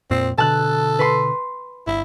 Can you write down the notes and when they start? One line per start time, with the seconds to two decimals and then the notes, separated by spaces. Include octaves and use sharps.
0.11 F2 A#2 C4
0.38 B2 D3 A4 A5 F#6
0.99 B4 C6
1.87 G1 E4